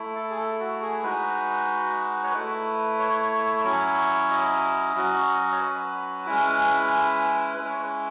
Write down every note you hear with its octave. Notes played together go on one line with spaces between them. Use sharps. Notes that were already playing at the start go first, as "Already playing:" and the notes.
Already playing: A3 E4
A4
G#4
A4
F#4
G#4
G#3 D#4 F#4 B4
C#5
A3 E4 B4
C#5
F#3 C#4 E4
D#5
F#3 C#4 F#4
C#5
B4
G#3 C#4 E4
G#3 C#4 E4 B4
C#5
B4